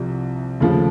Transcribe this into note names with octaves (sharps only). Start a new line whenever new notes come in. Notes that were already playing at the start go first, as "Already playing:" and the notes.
Already playing: C2 C3 F3
D#2 C#3 F3 A3